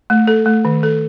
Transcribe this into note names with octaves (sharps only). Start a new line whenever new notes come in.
A3
A4
A3
D#3
A4